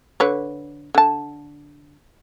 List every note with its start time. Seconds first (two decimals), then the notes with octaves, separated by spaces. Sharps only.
0.20 D3 B4 C#5
0.95 D3 A5